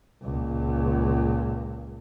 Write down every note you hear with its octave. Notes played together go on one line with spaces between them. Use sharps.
C#2 A#2